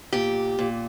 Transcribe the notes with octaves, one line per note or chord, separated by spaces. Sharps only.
A#2 G4
A#2